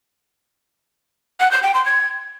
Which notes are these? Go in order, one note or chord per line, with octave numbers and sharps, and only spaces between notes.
F#5
G6
G5
C6
G#6